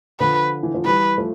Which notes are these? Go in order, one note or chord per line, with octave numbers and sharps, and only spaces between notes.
D3 F3 B4
E3
F3
E3 G3 B4
F3 A3